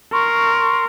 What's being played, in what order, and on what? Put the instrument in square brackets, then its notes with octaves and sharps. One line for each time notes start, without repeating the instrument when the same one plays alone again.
[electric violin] A#4 [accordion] C6 C#6